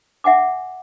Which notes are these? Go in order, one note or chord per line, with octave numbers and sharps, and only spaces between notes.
E5 F#5 G#5 D6